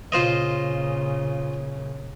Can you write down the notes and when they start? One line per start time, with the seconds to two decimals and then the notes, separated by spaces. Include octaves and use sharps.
0.12 A#2 C#3 F4 C5 D#5